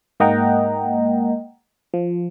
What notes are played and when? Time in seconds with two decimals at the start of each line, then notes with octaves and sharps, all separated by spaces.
0.20 G#2 A#3 D#5 F#5 G5 A#5
1.94 F3